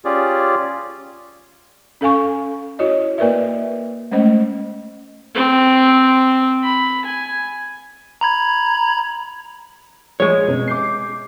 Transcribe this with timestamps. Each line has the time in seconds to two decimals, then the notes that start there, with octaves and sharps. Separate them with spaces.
0.05 C#4 F4 G4 G#4 D5
2.01 C#4 A4 F5 G#5 C#6
2.79 E4 F#4 C#5 D#5
3.18 A#3 A#4 B4 D5 E5
4.11 G#3 A3 C#4 C5 D#5
5.35 C4
6.64 B5
7.05 G#5
8.21 A#5 B5 G#6
10.20 A#1 G#3 C#5
10.48 B2 C4 C#4
10.67 D6 G6 C7